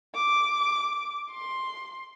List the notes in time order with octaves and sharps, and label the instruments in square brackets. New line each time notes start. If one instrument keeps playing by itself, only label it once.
[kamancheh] D6
C6